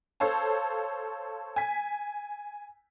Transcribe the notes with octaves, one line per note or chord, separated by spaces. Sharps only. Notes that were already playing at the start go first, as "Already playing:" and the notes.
A4 C5 C#5 F5 A5
G#5 B6